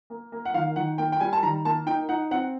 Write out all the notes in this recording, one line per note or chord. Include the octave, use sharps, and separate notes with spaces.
A#3
A#3
F#5
D#3 F5
D#3 F#5
A#3 G5
G5
G3 G#5
A5
D#3 A#5
A#3 A5
D#4 G5
D#4 F#5
C4 F#5